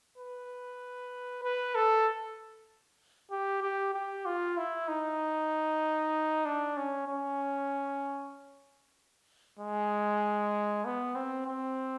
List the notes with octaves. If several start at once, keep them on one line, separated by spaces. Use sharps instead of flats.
B4
B4
A4
G4
G4
G4
F4
E4
D#4
D4
C#4
C#4
G#3
B3
C4
C4